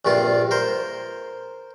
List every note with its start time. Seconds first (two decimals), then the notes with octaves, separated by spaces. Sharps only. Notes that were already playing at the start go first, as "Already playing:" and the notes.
0.05 A#1 G2 C3 F4
0.51 A#4 C5